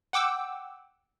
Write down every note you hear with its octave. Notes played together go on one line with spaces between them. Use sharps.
F#5 G5 D6 E6